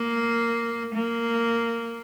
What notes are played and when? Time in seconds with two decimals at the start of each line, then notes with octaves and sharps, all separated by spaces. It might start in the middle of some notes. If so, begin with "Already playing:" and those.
Already playing: A#3
0.95 A#3